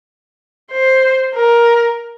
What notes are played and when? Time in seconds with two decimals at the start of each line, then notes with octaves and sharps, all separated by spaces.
0.72 C5
1.35 A#4